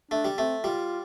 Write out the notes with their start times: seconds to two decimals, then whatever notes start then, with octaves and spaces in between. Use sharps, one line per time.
0.11 A3 D4
0.25 G3
0.37 A3 C4
0.63 G3 F4